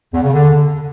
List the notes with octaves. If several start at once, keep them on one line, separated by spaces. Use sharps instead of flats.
E2
C#3
D3